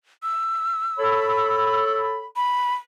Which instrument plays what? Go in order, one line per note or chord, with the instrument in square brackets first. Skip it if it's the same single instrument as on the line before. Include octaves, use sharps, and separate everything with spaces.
[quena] E6
[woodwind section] A4 C#5 B5
[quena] B5